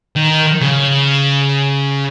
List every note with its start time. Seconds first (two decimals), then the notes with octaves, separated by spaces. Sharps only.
0.16 D#3
0.61 C#3